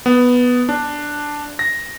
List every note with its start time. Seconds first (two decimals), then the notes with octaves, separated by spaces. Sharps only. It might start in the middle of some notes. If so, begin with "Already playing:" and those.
0.06 B3
0.69 D4
1.59 A#6